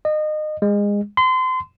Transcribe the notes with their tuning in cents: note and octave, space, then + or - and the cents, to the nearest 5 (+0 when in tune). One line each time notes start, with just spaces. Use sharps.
D#5 -25
G#3 -25
C6 -30